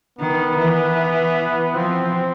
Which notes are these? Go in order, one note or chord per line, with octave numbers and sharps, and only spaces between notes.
D#3 B3
E3
F3 C4